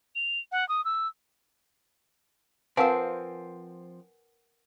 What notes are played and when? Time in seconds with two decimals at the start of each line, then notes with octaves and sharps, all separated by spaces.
0.15 F7
0.52 F#5
0.69 D#6
0.85 E6
2.77 F3 C4 A#4 B4 F5 F#5 G#5 A5